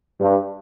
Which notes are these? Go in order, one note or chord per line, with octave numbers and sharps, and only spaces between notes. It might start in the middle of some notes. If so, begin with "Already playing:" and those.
G2